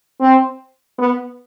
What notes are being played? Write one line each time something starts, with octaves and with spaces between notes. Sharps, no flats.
C4
B3